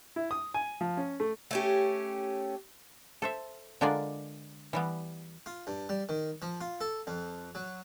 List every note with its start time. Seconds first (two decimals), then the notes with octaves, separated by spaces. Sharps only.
0.16 E4
0.31 D#6
0.54 G#5
0.81 F3
0.97 C#4
1.20 A3
1.51 A3 C#4 G4
3.22 A4 C5 E5
3.81 D3 G#3 D4 F4 A#4 D5
4.73 E3 G3 B3
5.46 F4
5.67 G2
5.89 G3
6.09 D#3
6.42 F3
6.61 F4
6.81 A4
7.07 F2
7.55 F#3